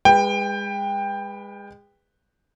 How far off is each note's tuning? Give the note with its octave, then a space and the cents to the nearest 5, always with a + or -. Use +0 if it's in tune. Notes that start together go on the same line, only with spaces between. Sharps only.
G#3 -30 B4 +0 G5 +15